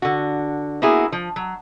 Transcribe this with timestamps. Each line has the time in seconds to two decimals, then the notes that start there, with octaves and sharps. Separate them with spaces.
0.02 D3 F#4
0.82 A#3 B3 E4 F#4 G#4
1.12 F3
1.36 F#3